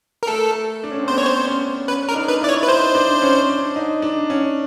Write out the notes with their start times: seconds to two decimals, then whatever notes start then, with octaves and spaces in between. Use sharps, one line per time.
0.23 A#4
0.27 A3 A4
0.84 D4
0.91 C#4
1.00 C4
1.08 B3 C5
1.18 C#5
1.27 C5
1.48 C#4
1.88 C#4 B4
2.09 A#4
2.11 D4
2.15 D#4
2.28 B4
2.41 E4 D5
2.49 C#5
2.63 B4
2.68 D#4 C5
2.95 D4
3.22 C#4
3.49 D4
3.76 D#4
4.02 D4
4.30 C#4